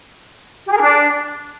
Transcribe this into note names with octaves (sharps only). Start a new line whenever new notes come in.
G4
G#4
A#4
D4